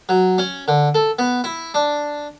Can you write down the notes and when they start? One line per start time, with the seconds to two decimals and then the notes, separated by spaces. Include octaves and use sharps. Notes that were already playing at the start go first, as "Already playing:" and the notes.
0.09 F#3
0.38 C#4
0.68 D3
0.95 A4
1.19 B3
1.44 E4
1.74 D4